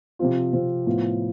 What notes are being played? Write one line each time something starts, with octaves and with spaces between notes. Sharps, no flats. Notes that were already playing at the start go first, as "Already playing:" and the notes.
C3 F3 C4 F4
C3 F3 C4 F4
A2 F3 B3 F4